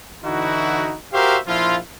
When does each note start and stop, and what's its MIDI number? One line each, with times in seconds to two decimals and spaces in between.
0.24 0.95 50
0.24 0.95 52
0.24 0.95 63
0.24 0.95 64
0.24 0.95 66
1.13 1.38 66
1.13 1.38 67
1.13 1.38 70
1.13 1.38 72
1.13 1.38 76
1.13 1.38 77
1.47 1.78 34
1.47 1.78 53
1.47 1.78 64
1.47 1.78 65